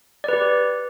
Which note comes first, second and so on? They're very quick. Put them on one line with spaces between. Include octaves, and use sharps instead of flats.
D5 B4 G4